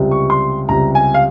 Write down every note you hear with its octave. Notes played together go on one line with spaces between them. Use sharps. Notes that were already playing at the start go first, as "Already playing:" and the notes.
Already playing: C#2 C3 G3
C#6
C6
C#2 C3 G3 A#5
G#5
F5